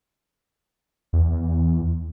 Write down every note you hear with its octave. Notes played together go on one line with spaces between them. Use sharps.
E2